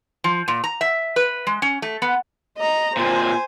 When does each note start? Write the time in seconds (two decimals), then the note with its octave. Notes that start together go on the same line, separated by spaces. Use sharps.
0.24 F3
0.48 A#2
0.64 A#5
0.81 E5
1.16 B4
1.47 G#3
1.62 C#4
1.82 A3
2.02 B3
2.58 D#5 A#5
2.97 A#2 C4 C5 G#5